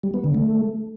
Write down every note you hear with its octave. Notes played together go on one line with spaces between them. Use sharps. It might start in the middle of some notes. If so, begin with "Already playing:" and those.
G3
B3
D3
A3